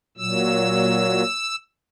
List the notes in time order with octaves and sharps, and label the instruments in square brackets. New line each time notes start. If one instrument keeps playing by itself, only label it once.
[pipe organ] A#2 F#3 E6